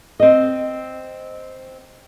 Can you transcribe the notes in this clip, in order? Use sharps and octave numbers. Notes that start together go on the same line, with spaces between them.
C4 D#5